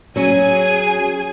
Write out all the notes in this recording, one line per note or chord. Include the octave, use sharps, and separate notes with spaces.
F#3 C#4 G#4 G#5